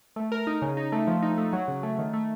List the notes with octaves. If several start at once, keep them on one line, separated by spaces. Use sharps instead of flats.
A3
A#4
D#4
C#3
D#4
A3
F3
D#4
A3
F#3
C#3
A3
D#3
A3